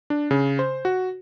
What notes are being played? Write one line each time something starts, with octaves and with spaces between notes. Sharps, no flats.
D4
C#3
C5
F#4